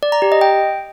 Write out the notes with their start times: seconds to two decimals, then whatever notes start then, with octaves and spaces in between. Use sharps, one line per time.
0.03 D5
0.12 A#5
0.22 G4
0.32 D#5
0.41 G5